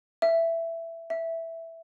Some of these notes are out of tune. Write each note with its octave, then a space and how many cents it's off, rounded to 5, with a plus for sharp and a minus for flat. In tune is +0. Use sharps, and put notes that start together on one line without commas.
E5 +10
E5 +0